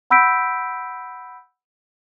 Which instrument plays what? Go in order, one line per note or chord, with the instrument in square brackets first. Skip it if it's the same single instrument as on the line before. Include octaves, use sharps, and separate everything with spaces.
[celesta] F#5 B5 E6 G6 B6 D7